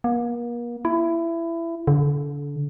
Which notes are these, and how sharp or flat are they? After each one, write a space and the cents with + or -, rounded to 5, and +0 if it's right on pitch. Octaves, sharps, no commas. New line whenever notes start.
A#3 +40
E4 +20
D3 -30